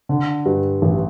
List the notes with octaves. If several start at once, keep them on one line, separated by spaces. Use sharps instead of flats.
D3
G2
A1